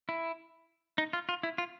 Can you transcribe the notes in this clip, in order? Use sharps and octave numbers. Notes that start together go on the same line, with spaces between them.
E4
D#4
F4
F4
E4
F4